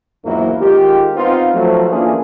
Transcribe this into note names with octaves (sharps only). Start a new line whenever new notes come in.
A#1 E2 G#2 F#3 A#3 E4
D#3 G#3 F4 G4
B3 C4 D#4 F4
F3 F#3 A3
E3 A#3 C#4 D4 F4 G#4